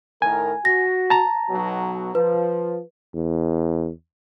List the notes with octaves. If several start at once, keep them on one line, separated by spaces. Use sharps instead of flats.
A2 D#3 A#4 G#5
F#4 A#6
A5 A#5
B1 B2 F#3
F3 B4
E2